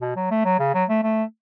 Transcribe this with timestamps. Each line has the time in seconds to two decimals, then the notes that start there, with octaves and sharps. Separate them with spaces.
0.01 B2
0.16 F#3
0.31 A3
0.45 F#3
0.60 C#3
0.74 F#3
0.89 A3
1.04 A3